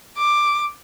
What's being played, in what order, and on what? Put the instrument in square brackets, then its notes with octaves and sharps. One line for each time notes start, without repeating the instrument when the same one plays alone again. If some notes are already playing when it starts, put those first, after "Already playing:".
[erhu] D6